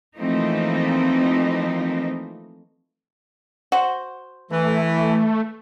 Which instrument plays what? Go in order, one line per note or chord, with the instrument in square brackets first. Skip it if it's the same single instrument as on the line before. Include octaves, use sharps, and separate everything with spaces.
[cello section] E3 F3 A3 A#3 C4 D#4
[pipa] F#4 C5
[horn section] E3 [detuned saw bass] A3